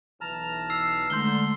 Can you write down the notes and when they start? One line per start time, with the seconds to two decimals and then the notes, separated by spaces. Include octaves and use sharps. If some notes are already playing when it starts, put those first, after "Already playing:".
0.21 B1 E3 A5 A#5 F6
0.70 E6 C7
1.10 D3 G#3 A3 C6 G6 G7